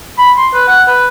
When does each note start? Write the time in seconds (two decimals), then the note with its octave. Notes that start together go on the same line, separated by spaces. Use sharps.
0.18 B5
0.37 C6
0.53 B4
0.68 F#5
0.87 B4